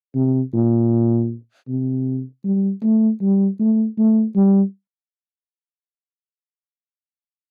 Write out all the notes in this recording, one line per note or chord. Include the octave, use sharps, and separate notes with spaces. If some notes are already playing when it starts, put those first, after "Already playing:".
C3
A#2
C3
G3
A3
G3
A3
A3
G3